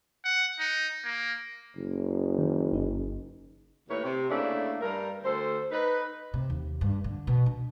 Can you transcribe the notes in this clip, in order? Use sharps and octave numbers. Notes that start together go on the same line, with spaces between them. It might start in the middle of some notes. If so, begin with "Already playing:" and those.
F#5
D#4
A#3
F#1
D#3
G1 D#4
D#2 A2 A#4 B4 C#5
C3
C#3 A3 A#3 D4 E4
G2 G3 A#4
D2 A4 C5
D#4 B4
C3
D#2
G2
D3
B2
D4